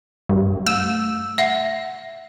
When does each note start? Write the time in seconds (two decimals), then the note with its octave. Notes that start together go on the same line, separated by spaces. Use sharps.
0.29 G2
0.66 A3 E6
1.38 E5 F#5